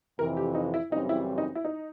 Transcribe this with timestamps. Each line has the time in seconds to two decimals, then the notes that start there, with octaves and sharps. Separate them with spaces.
0.19 F2 C3 E3 A#4
0.37 G4
0.55 D#4
0.74 E4
0.92 F#2 C#3 E3 G3 C4 D#4
1.09 E4
1.38 D#4
1.55 E4
1.65 D#4